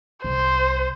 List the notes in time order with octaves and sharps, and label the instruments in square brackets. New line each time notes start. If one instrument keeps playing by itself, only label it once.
[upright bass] C2 [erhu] C5